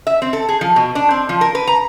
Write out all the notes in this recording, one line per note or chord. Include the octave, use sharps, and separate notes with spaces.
E5
C4
A4
G#4
F3
B2
D4
C4
F3
A#4
B4
A#5